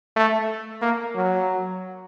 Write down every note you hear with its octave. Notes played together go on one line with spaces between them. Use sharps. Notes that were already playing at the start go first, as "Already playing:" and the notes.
A3
A#3
F#3